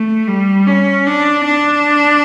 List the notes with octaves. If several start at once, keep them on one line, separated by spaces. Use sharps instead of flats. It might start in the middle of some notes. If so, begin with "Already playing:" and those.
Already playing: A3
G3
C#4
D4
D4